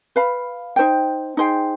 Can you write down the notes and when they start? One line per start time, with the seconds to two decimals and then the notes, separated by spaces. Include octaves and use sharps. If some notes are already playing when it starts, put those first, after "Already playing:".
0.16 B4 F5 B5
0.76 D#4 G#4 C5 G5
1.37 D#4 G#4 C5 G5